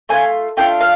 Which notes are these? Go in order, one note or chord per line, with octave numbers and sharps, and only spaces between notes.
A3 D4 F4 G#5
A3 D4 F4 G5
F5